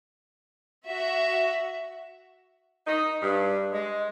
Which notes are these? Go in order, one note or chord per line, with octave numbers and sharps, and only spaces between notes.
F#4 E5
D#4
G2
G#3